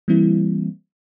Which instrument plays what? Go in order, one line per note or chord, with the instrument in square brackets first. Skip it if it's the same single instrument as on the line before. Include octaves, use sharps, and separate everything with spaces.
[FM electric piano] E3 G3 A#3 C4 E4